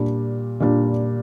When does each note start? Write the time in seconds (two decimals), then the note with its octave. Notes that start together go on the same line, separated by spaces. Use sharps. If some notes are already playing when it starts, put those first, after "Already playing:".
Already playing: A#2 G3 D4
0.60 A#2 G3 D4